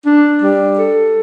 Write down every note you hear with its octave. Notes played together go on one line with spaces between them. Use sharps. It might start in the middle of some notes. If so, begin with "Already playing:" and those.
D4
G3
A4